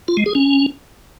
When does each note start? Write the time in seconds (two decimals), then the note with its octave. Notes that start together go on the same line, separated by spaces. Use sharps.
0.08 F4
0.17 G#3
0.26 G#4
0.35 C#4